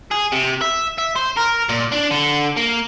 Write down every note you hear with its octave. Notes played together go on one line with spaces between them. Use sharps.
G#4
C3
E5
E5
C5
A#4
A#2
D4
D3
A#3